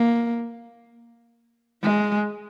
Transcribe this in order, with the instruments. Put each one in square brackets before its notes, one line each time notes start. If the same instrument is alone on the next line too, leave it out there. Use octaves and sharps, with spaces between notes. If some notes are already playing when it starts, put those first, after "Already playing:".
Already playing: [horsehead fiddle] A#3
G#3